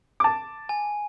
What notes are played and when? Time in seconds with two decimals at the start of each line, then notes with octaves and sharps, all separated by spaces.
0.20 A5 D6
0.69 G#5